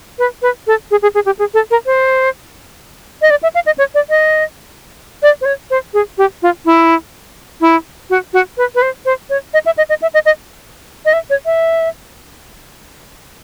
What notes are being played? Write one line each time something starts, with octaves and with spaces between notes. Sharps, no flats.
B4
B4
A4
G#4
G#4
G#4
G4
G#4
A4
A#4
C5
D#5
D5
E5
F5
D#5
C#5
D5
D#5
D5
C5
C#5
C5
G#4
G4
F4
E4
E4
F#4
F#4
B4
B4
C5
C5
C#5
D#5
E5
D#5
D#5
E5
D#5
D#5
D#5
E5
C#5
E5